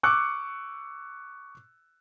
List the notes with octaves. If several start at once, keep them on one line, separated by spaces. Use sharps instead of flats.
C#6 D6 E6 F#6 C#7